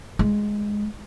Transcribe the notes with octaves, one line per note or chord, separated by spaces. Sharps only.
G#3